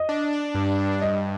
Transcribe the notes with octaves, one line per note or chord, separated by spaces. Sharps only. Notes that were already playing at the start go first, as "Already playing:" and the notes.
Already playing: D#5
D4
D4
G2
G2
G2 D#5